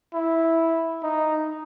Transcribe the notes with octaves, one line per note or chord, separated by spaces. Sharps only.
E4
D#4